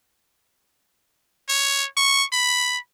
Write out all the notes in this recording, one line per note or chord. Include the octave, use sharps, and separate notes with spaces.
C#5
C#6
B5